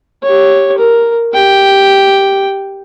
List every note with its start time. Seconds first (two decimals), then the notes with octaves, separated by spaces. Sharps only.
0.23 G4 C#5
0.78 A#4
1.34 G4 G5